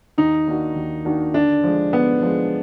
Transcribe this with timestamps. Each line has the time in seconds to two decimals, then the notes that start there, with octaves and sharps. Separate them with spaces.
0.18 D#2 D#4
0.47 D#3 A#3 D4 F#4
0.76 D#2
1.05 D#3 A#3 D4 F#4
1.34 D3 D4
1.64 F3 G#3
1.93 D3 B3
2.22 F3 G#3